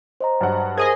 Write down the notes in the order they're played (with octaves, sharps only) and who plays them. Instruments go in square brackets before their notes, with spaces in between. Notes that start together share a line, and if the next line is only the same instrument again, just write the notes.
[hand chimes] C5 D#5 A#5
[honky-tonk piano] G2 F#3 F#5
[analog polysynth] G#4 D#5 G#5 [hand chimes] A#4 C5